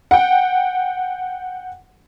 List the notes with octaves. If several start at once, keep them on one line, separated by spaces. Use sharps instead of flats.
F#5 G5